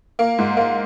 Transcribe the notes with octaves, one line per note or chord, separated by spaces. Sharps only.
A#3
G#2
A#3